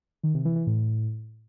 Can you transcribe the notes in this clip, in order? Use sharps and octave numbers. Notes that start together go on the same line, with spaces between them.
D#3
C3
E3
E3
A2